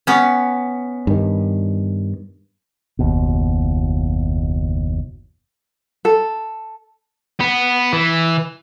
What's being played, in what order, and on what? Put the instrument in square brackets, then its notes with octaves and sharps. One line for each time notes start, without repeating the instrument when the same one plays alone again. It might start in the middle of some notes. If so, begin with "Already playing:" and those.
[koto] B3 C#4
[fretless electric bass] G2 D#3
[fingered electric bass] F#1 D#2 B2
[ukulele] A4
[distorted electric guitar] B3
E3